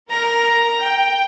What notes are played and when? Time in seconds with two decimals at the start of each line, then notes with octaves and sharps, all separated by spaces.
0.11 A#4 A#5
0.81 G5